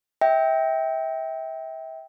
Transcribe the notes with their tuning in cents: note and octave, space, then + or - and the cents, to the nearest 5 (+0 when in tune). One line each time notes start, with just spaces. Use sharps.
E5 -30 G5 +0